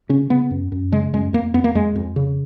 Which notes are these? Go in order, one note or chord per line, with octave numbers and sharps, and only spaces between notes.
C#3 C#4
C#3 B3
F#2
F#2
C#3 G#3
F#2 G#3
F2 A#3
F2 B3
A#3
F2 G#3
F2
C#3